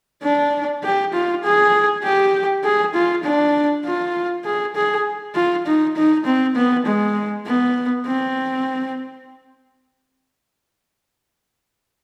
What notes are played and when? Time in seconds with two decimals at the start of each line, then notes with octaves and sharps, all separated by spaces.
0.23 D4
0.83 G4
1.13 F4
1.44 G#4
2.03 G4
2.64 G#4
2.94 F4
3.24 D4
3.85 F4
4.45 G#4
4.75 G#4
5.35 F4
5.66 D#4
5.96 D#4
6.25 C4
6.56 B3
6.86 G#3
7.46 B3
8.06 C4